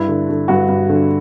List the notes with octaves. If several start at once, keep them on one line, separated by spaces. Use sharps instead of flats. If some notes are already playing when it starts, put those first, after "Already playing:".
Already playing: G2 E4
D3
D3
G2 F#4
G2
D3